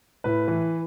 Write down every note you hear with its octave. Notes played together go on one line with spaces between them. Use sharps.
A2 B4
E3